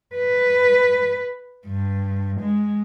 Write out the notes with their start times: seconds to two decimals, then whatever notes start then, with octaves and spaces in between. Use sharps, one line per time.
0.16 B4
1.67 G2
2.41 G#3